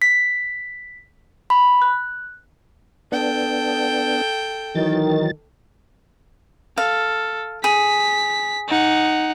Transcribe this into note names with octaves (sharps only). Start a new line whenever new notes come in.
B6
B5
F#6
B3 D4 A4 G5
D#3 E3 F#3 A6
A4 F5
G#4 B6
D#4 F#5